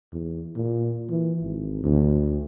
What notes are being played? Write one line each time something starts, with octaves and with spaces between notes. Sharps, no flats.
E2
A#2
E3
G#1
D2